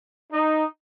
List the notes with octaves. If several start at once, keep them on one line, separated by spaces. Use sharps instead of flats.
D#4